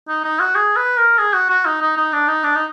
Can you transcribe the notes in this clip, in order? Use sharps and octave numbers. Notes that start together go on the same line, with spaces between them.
D#4
D#4
F#4
G#4
B4
A#4
G#4
F#4
F#4
D#4
D#4
D#4
D4
D#4
D4
D#4